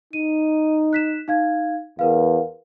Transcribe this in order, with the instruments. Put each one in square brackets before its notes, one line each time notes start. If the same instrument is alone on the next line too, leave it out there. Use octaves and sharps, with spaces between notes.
[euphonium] D#4 [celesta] D#7
[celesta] F#6 B6 E7
D#4 F5 G#6
[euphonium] E2 [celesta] A#4 B4 F5